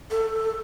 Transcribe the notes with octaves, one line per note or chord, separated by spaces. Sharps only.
A4